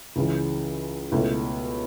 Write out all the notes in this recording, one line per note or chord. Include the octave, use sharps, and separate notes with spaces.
C#2 C#3 E3
C#2 B2 A3 C#4 E4